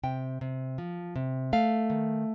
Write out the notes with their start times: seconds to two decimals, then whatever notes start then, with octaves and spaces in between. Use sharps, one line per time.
0.03 C3 G5
0.41 C3
0.78 F3
1.16 C3
1.53 A3 F5
1.90 D#3